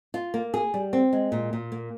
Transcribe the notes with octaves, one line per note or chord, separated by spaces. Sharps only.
F4
A#3
G#4
G3
C4
G#3
A#2
A#2
A#3